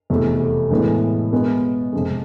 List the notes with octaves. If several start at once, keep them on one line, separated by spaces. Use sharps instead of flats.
F1 E2 B2 A3
A2 E3 G#3 B3
B2 G#3 B3
F2 C3 G#3